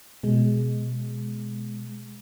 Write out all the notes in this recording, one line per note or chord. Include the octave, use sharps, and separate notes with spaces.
B2 G#3